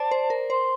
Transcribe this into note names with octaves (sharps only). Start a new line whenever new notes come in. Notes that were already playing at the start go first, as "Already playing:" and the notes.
Already playing: C5 D5 A5
C5
A#4
C5 C6